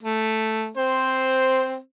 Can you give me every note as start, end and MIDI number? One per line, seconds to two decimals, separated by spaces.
0.03 0.70 57
0.77 1.78 60
0.77 1.78 72